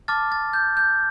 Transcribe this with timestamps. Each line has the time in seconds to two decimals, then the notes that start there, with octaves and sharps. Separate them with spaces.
0.08 A5 D6 F6 A6
0.32 A6
0.53 G6
0.77 G6